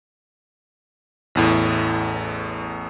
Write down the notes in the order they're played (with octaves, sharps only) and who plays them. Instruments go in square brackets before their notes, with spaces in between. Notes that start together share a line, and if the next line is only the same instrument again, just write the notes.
[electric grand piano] A1 E2 A2